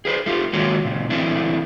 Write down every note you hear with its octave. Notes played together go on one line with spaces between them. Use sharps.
G#4 B4 C5
A3 F4 G4
D#3 G#3 A#3 C#4 F#4 C#5
A#2 C#3
E3 A3 C4 D4 E4